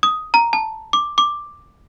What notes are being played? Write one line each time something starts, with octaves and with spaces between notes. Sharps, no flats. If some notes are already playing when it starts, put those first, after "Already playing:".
D#6
A#5
A5
D6
D6